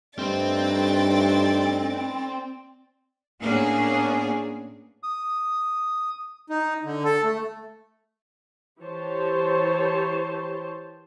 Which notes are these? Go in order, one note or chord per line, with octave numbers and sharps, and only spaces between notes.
G2 A3 C4 D#4 B4 D5 A6
A2 A#3 B3 C#4 D4 G#4
D#6
D#4
D3
A4
A3
E3 G4 C5 C#5 A5